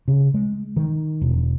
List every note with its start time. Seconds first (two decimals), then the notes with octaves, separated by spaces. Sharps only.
0.08 C#3
0.34 G#3
0.76 D#3
1.21 E1